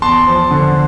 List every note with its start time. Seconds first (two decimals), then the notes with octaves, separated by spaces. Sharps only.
0.02 E2 A5 C6
0.27 F3
0.51 D3